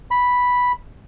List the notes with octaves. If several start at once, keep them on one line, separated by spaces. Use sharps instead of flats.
B5